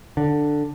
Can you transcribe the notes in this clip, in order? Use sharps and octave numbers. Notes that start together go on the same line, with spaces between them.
D3